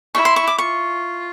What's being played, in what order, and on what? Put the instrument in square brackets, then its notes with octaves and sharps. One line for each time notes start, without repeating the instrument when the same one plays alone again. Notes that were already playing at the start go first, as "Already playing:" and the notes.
[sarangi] E4 [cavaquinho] C#6
[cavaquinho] C6
C#6
D6
[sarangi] F4 [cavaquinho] C#6